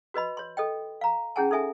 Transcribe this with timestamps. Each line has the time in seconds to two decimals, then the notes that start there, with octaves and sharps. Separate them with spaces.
0.14 F#4 B4 D#5 B5
0.37 C#5 C6
0.57 A4 D#5 G5
1.01 F5 A#5
1.36 C#4 E4 G#4 F#5 G#5 A5
1.51 D#4 A4 E5 G#5